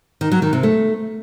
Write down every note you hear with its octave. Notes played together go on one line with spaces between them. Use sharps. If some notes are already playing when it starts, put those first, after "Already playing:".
D#3
F#3
D#3
C3
A3